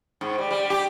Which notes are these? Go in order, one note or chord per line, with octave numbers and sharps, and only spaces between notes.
G#2
G3
G3
G4